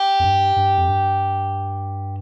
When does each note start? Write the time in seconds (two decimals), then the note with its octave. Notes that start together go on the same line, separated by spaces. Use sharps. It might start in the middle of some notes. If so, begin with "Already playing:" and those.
Already playing: G4
0.19 F2
0.24 G2
0.56 G2
0.78 F2
0.88 G2